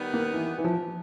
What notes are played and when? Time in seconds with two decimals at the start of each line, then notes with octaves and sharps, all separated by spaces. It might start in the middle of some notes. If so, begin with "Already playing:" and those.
Already playing: D#3 G3 B3
0.14 A#3
0.34 E3
0.58 E3
0.64 F3